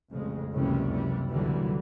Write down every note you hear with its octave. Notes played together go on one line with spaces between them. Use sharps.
A1 F2 C#3 G#3
F#1 C#2 C3 E3 G3 C#4
C3 E3 G3
C2 A#2 D3 E3 F#3 G3